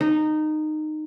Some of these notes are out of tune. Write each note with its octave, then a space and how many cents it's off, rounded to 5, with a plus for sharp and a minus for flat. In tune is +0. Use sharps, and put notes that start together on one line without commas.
D#4 -15